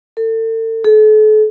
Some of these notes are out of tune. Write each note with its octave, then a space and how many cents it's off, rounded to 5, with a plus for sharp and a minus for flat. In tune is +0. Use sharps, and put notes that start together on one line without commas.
A4 +40
A4 -40